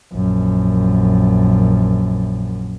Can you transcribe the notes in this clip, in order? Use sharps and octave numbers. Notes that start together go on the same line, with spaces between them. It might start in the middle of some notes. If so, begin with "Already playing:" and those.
A#1 F#2